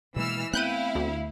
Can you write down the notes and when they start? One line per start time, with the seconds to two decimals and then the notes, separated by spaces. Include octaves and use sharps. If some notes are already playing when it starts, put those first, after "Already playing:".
0.16 B2 E3 G#3 A#3 E6 F6
0.53 A3 B3 C4 E4 F5 F#6 G6 D#7
0.95 D2